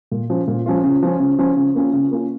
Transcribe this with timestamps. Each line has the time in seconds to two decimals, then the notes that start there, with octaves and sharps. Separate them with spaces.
0.11 A#2
0.30 F3 C#4 F4
0.48 A#2
0.66 F3 C#4 F4
0.84 C#3
1.02 F3 C#4
1.20 C#3
1.39 F3 C#4
1.57 C#3
1.75 A#3 C#4 F4
1.93 C#3
2.11 A#3 C#4 F4